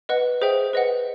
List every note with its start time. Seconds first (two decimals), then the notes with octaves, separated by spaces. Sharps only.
0.09 B4 D#5 F#5
0.41 G#4 C5 E5 G5
0.73 B4 D#5 F#5